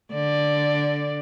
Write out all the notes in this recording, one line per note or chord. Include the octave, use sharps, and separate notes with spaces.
D3 D5